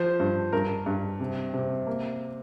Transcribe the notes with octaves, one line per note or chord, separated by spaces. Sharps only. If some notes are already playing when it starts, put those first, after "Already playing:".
Already playing: F3 C5
G2
G2 A#4
G2
C3
C3
A#3